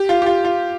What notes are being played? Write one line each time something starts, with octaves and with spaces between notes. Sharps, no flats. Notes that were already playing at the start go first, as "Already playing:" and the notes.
Already playing: G4
F4
G4
F4
F4